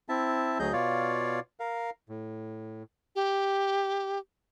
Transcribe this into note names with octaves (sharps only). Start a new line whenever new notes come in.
C4 E4 E5 A5
D2 F#3 G#4 D#5 G6
B2 F4 C#5 D5 F5
A#4 F5
A2
G4